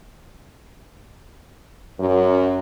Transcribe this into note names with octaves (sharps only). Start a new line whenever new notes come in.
F#2